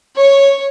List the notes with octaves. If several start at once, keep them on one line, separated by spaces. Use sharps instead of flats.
C#5